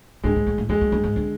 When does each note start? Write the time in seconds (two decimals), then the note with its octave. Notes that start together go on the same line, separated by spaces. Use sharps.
0.23 G2 G#3
0.36 G#2
0.47 A2
0.58 A2
0.69 F2 G#3
0.81 F#2
0.92 G2
1.04 G#2
1.16 D3